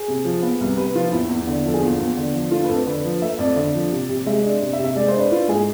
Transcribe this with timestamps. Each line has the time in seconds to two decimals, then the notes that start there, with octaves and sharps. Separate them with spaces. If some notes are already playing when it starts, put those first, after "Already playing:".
Already playing: G#4
0.08 C3
0.25 F3
0.43 B3
0.61 C2
0.77 C3 B4
0.95 F3 F4
1.12 E2 E4
1.30 E2
1.47 D3
1.65 F3 A4
1.74 G#4
1.82 E2 F4
1.99 E2
2.17 D3
2.35 F3
2.51 A3 F4
2.64 B4
2.69 F2 A4
2.87 D3 B4
3.05 F3
3.22 A3 E5
3.39 F2 D5
3.56 D3
3.75 F3
3.91 C3
4.09 C3
4.26 G#3 E5
4.43 D4
4.61 C3
4.73 E5
4.79 C3
4.84 E5
4.96 G#3 D5
5.08 C5
5.14 D4 B4
5.31 E4 F4
5.48 G#2 G#4